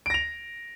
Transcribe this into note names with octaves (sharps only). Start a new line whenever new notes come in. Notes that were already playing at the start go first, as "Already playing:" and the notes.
A#6 D7 F7